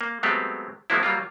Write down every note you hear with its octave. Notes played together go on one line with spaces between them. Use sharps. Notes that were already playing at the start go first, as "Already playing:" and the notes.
A#3
F#3 G#3 A3 B3 C4 G4
F3 F#3 G#3 A#3 C4 E4
F#3 G3 A#3 F4